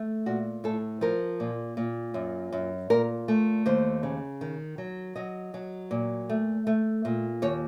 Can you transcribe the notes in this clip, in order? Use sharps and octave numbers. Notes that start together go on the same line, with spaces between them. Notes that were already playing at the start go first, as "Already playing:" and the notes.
Already playing: A3
A#2 F#4
A2 A4
F3 A#4
A#2
A#2
F#2
F#2
A#2 A#4
A3
D#2 C5
C#3
D#3
F#3
F#3 D#5
F#3
A#2
A3
A3
A#2
D#2 C#5